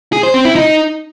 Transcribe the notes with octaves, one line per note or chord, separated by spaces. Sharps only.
G#4
C5
C4
E4
D#4